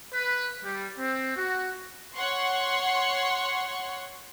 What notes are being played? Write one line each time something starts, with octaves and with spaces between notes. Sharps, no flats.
B4
G3
C4
F#4
C#5 F#5 C6 C#6